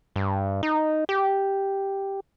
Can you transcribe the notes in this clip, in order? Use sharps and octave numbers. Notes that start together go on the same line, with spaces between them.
G2
D#4
G4